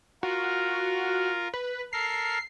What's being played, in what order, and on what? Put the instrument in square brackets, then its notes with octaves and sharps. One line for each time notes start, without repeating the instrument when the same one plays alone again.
[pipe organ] F4 A#4 [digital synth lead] F#4
[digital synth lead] B4
[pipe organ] A4 A#4 F6 [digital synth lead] C7